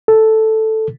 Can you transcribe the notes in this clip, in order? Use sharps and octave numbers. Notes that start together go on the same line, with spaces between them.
A4